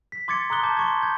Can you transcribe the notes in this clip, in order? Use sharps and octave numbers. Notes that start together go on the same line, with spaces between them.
B6
C6 D6 G#6 A6 C#7
A#5 C6 D#6 F#6 G7
A5 D6 G6
C6 C#6 G#6
G6 G#6